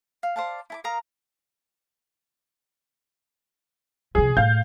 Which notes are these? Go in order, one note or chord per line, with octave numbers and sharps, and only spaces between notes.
F5
C5 D5 F5 A5
E4 A5 D6
A#4 F5 A#5 D#6
C3 F3 G#4
A2 F5 G6